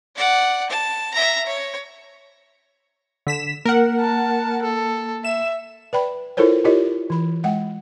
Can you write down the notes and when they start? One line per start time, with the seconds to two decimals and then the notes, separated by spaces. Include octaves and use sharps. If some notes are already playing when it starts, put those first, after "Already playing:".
0.16 D5 F#5
0.70 A5
1.14 E5 A#5
1.46 C#5
3.27 D3 B6 E7
3.65 A#3 A#4 F#5
4.00 A5
4.63 A4
5.24 E5 E7
5.93 B4 D5 G5 B5
6.37 E4 F4 A4 A#4 C5 C#5
6.65 E4 F4 G4 A#4 C#5 D#5
7.10 E3 B5
7.44 G#3 F#5 G5